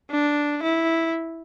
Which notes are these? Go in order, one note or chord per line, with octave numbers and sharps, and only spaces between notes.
D4
E4